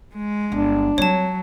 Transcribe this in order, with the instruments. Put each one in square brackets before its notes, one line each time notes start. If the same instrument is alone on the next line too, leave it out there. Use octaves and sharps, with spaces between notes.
[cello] G#3
[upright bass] G1 [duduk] D4
[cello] F#3 [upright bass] G3 C4 [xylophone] C#5 A5